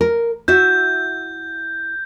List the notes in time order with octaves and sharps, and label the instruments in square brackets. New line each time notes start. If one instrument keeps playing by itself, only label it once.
[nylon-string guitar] A#4
[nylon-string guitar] E4 F#4 E5 [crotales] G6